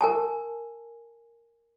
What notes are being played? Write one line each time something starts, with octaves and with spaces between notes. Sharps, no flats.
A#4 G#5 A5